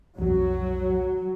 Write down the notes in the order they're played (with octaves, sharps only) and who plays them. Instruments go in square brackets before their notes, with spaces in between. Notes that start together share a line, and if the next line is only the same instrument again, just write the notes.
[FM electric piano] B1 F2 [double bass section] F#3